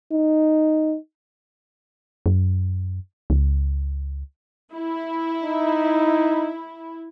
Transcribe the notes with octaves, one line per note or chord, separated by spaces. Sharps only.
D#4
F#2
C#2
E4
D#4